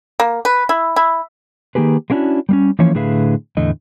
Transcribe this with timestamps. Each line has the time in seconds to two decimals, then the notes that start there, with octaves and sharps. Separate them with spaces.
0.20 A#3
0.45 B4
0.69 E4
0.96 E4
1.75 D#3 A#3 G4 G#4 B4
2.10 G#3 A#3 C#4 D4 E4 F#4
2.49 G3 A#3 C#4
2.79 E3 F3 A#3 C#4 C#5
2.95 A2 D3 G#4 B4 E5 F5
3.57 E2 A2 D3 A3 D#5